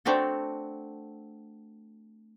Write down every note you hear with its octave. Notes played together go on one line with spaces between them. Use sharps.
A3 C4 D4 F#4 A4